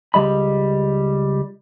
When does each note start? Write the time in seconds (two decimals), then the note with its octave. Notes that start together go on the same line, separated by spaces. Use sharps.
0.14 C#2 G3 D#5 B5